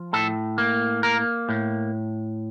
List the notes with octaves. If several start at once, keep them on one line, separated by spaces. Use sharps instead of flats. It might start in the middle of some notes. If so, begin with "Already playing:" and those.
Already playing: F3
A2 A4
A#3
A#3 A#4
A2